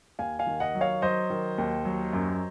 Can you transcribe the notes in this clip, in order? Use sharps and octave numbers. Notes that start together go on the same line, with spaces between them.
D#2 F5 G#5
F5 G#5
D#3
D#5 F#5
F#3
C#5 F5
F#3 C5 D#5
D#3
D#2
F#3
F#2